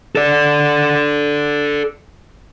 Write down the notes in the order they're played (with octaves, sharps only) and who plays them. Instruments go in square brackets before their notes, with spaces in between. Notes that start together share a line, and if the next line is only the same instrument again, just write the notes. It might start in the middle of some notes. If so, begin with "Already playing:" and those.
[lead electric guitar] A4 D5